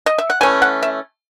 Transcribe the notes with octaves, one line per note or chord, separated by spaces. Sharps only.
D#5
E5
F#5
E3 A3 C#4 G#5
F#5
E5